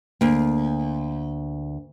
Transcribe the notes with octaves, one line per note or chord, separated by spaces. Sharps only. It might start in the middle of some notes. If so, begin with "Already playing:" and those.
D2 A#3